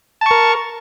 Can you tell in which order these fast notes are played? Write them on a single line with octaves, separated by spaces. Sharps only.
A5 C#6 A#4